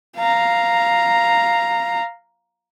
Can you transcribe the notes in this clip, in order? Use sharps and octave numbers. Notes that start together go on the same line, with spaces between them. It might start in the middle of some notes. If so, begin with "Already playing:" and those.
F5 A#5